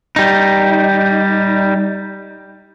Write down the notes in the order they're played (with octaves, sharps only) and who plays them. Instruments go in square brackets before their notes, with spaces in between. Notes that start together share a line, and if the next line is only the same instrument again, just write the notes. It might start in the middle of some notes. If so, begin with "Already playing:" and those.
[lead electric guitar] G3 D#4